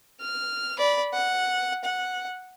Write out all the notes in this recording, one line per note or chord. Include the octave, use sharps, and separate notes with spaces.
F6
D5 B5
F#5
F#5